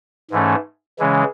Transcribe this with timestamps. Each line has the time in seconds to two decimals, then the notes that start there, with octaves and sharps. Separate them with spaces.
0.31 G#2 E3 A3 C#4
0.99 C#3 E3 G#3 C#4